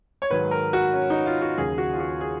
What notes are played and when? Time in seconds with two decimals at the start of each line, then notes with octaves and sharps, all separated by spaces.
0.22 C#5
0.30 G#2 D#3 F#3 B4
0.51 A#4
0.73 F#4
0.93 C#4
1.10 D#4
1.26 F4
1.42 F#4
1.57 D#2 C#3 F#3 G#4
1.78 F#4
1.93 F4
2.00 F#4
2.21 G#4